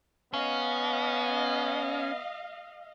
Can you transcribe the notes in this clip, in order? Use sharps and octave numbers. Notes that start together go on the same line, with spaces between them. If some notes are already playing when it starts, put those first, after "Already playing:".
B3 C#4 D#5 F5